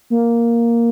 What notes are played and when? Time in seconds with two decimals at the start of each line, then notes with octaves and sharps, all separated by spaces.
0.10 A#3